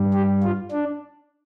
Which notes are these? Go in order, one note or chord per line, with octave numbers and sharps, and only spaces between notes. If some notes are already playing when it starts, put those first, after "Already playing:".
Already playing: G2 G3
G4
F4
D4